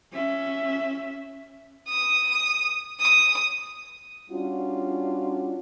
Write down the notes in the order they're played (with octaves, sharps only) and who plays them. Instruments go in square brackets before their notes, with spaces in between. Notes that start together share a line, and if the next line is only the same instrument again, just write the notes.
[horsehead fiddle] C#4 E5
[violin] D#6
D#6
[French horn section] G3 C#4 D4 F4 F#4